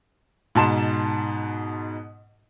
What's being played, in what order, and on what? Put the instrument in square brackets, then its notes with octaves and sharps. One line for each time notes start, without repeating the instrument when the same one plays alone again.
[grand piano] G#2 B2 A5 C6 E7